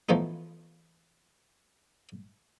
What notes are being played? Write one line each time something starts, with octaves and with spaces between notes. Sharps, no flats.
E3 F3 A3 B3 D#4